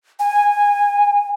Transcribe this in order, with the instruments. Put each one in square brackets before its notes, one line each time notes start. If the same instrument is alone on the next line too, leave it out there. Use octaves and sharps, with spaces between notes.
[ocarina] G#5